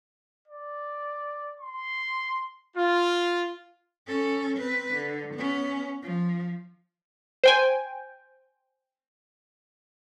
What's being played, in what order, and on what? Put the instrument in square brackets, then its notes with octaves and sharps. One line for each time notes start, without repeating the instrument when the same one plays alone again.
[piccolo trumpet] D5
C6
[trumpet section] F4
[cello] C#4 A4
C4 B4
D3
B3 C#4
F3
[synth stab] C5 G5 G#5